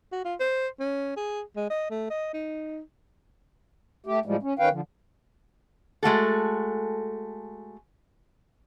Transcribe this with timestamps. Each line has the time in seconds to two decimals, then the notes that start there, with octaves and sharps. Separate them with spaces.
0.12 F#4
0.25 F4
0.40 C5
0.80 C#4
1.17 G#4
1.56 G#3
1.70 D#5
1.90 A3
2.10 D#5
2.34 D#4
4.06 A3 G4
4.26 A2 F3 G3 G#3
4.43 C#4
4.59 D#3 C#4 B4 F5 G5
4.71 D3 F3
6.03 G#3 A3 F#4 A4